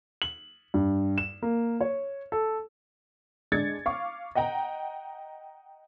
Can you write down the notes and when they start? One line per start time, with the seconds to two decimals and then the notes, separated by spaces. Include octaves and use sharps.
0.22 F#7
0.74 G2
1.18 E7
1.42 A#3
1.81 C#5
2.32 A4
3.52 G#3 D4 G#6 A6 C#7
3.86 F5 C#6 D6
4.35 D#5 F#5 G5 A#5